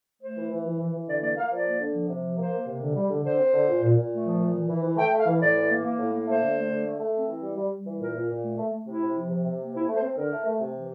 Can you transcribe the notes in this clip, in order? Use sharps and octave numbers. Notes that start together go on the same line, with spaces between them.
A3 C5
E3
E3
E3
E3
E3
D3 D5
A#3 D5
A#3 F5
F3 D5
A#3
D3
F3
C3
F3
A#3 C5
A#3
C3
D3
G3
D3
D3 C5
C4
D3
A#2
A#2
A#2
A3
F3
A#2
E3
E3
E3
A3 G5
A3
F5
E3
A2 D5
E3
A#3
A#3
A2
A#3
A3 C5
D3
A3
D3
A3
A3
C4
E3
G3
G3
G3
E3
A#2 A#4
A#2
A#2
A3
A3
A3
C3 E4
C3
F3
C3
C3
A#3
C4 E4
A3
C5
C4
D3 A#4
A3
A3
C3
E3